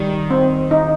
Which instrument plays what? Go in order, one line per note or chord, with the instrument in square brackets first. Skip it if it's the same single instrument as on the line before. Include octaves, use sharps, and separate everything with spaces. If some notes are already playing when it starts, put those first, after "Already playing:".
Already playing: [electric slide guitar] D#3 [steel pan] G3
[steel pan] C4
D#4